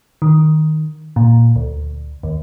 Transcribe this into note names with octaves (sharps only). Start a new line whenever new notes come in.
D#3
A#2
D2
D#2